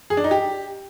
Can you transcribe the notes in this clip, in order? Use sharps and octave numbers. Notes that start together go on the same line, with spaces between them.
G#4
D4
D#4
G4